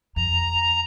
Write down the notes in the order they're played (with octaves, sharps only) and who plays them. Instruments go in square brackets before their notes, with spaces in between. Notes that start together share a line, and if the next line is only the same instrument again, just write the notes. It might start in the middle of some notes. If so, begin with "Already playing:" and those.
[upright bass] F2 [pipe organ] A#5